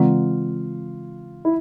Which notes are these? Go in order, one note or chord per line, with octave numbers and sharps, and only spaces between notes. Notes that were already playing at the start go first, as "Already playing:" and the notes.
Already playing: C#3 E3 G#3 C4 F4
E4